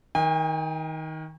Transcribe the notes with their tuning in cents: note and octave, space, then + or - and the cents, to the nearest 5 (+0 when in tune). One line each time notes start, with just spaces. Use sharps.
D#3 +20 G#5 -45